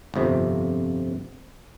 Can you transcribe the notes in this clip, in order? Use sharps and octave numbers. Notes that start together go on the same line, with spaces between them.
G1 F2 C3 F3